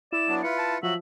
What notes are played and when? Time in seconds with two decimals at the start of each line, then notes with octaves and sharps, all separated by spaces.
0.12 E4 D5 E7
0.28 F#3 B3 D4
0.43 F4 B4 C#7
0.58 A5
0.83 F3 F#3 F#4 E5 F#7